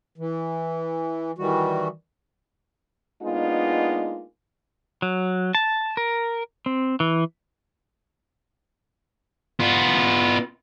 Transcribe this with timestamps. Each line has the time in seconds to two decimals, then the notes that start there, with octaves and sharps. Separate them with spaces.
0.18 E3
1.38 D#3 E3 G3 F#4
3.22 G#3 A#3 B3 D4 D#4 F4
5.02 F#3
5.55 A5
5.97 A#4
6.66 C4
7.00 E3
9.60 B3 F4